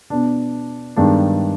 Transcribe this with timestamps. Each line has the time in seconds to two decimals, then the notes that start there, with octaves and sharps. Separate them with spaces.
0.10 B2 B3 D4
0.96 G2 D#3 G#3 B3 D4